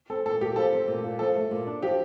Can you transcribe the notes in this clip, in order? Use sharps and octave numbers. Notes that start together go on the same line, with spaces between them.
C4 A4
A#2 A4
A#2 G4
F3 A4
C4
A#2
A#2
F3 A4
A3
A#2
D4
F3 G4